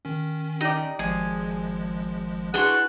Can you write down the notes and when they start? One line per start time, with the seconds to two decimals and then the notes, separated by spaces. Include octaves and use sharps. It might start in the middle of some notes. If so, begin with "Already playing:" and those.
0.05 D#3 C#4
0.61 D#4 G4 D5
0.99 G#1 F3 G#3 G#4
2.54 D4 E4 F#4 G#4 B4 F#5 C6 C#6